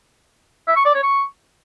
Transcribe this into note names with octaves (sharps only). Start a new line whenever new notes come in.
E5
C#6
D5
C#5
C#6